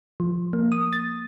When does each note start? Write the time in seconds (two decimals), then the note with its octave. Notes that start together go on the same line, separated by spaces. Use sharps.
0.20 F3
0.53 A#3
0.72 D#6
0.93 A6